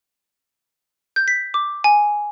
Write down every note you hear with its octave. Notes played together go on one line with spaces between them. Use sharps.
G6
B6
D6
G#5